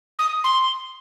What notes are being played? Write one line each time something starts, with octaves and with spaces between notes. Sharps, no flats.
D#6
C6